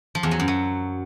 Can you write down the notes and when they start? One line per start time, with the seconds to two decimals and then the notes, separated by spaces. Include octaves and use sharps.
0.15 F3
0.23 E2
0.31 F#3
0.40 F#2
0.48 F#3